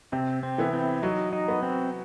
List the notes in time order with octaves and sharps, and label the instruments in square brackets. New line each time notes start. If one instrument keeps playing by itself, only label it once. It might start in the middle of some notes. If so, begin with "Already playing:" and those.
[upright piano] C3 [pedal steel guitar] C4
[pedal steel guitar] C4
[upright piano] E3 B3 E4
[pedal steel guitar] C4
[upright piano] F#3 [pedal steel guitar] D#4
[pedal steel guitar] D#4
[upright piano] B3 F#4
[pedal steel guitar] C4